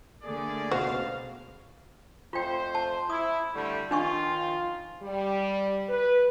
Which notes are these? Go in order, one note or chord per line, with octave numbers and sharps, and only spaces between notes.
D3 A3 A#3 G#4 D5
C#2 B2 F#4 C5 F5
F2 A3 F4 C5 G5
A5
E4 D#6
D3 G3 A3
D#3 F3 D4 F4 G#5 C#6
G3
B4